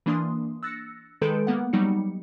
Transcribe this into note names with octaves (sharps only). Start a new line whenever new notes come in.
E3 A#3 D4 C6 D#6
E6 F#6 A6 A#6 C#7
D#3 G#3 A4 B4 G6 D7
A#3 B3 F#5
F#3 G3 D#4 C#7